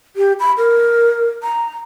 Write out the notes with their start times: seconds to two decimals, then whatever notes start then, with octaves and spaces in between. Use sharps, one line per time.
0.16 G4
0.40 B5
0.58 A#4
1.43 A#5